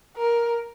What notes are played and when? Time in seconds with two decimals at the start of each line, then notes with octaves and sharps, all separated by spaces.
0.17 A#4